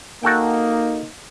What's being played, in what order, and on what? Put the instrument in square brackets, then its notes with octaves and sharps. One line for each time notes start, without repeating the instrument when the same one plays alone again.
[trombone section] A#3 D#4 [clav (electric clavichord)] F#4 A4 G5